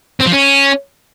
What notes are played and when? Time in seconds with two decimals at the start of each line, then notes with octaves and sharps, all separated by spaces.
0.20 C4
0.26 F3
0.32 C#4